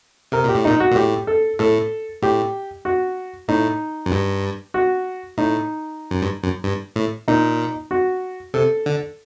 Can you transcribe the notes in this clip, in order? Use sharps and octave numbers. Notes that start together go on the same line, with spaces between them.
C3 A#4
A#2 G4
A2
A#2 D#4
F#4
A#2
A2 G4
A4
A2 A4
A2 G4
F#4
A2 D#4
F#2
G2
F#4
A2 D#4
F#2
G2
F#2
G2
A2
A#2 D#4
F#4
C3 A4
D3